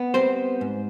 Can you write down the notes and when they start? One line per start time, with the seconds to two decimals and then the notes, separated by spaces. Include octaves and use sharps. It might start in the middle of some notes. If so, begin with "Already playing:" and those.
Already playing: B3
0.14 G3 C4 C5
0.61 G#2